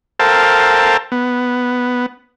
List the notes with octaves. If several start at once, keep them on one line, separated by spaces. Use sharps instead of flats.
A4 A#4 C5 F5 G5 A5
B3